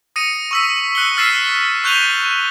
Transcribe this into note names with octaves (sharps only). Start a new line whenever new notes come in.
D#6 A#6 C#7 D#7
C#6 E6 B6
E6 F#6 C#7 G7
E6 F6 A6 B6 C7 E7
C#6 F#6 G6 D#7 F7 G7